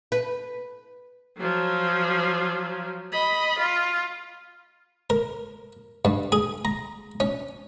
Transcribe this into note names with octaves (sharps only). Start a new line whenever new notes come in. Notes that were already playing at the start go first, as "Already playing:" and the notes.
B4
F3 F#3
D#5 B5
F4
A#4
G2
G#4
A#5
C#4